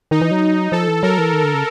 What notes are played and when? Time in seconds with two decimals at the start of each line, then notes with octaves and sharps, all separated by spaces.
0.11 D#3 D#4
0.21 E3
0.31 F#3
0.72 F3 A4
0.88 E3
1.03 F#3 A#4
1.18 E3
1.33 D#3
1.44 D3
1.54 C#3